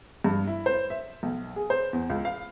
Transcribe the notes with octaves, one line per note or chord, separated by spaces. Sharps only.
G2
E4
C5
E5
B1
G#4
C5
E2
C#2
F5